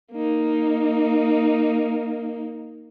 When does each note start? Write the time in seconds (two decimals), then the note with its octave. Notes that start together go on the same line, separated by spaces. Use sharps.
0.12 A#3 D#4